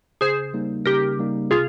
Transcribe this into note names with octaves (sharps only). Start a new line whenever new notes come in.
C#3 G#4 C5
G3 A#3 D#4
C#3 G4 A#4
G3 A#3 D#4
C3 F4 G#4